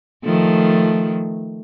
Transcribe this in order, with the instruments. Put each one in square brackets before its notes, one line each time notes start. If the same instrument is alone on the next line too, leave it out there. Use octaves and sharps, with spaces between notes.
[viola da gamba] D#3 F3 A3